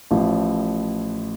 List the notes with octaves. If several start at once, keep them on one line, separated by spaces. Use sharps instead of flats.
A1 A2 F3